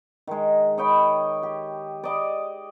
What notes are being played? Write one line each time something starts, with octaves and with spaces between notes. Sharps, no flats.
D#3 G#3
C#5 D#5 G5 B5
G4
D5 D#5 D6